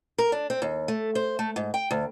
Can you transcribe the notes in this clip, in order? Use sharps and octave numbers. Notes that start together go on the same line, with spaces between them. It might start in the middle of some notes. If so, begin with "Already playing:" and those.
A#4
D4
C4
D#2
A3
C5
A3
G#2
G5
D2